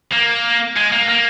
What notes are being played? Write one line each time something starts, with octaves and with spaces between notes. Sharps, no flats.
A#3
G#3
A#3
A#3